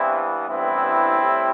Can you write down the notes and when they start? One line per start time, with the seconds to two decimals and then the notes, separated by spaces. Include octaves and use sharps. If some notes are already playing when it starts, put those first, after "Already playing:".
Already playing: G2 E3 B3 C4 E4
0.48 A1 G2 E3 B3 C4 E4
1.20 A2 G3